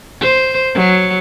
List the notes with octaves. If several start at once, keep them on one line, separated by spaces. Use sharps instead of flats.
C5
F#3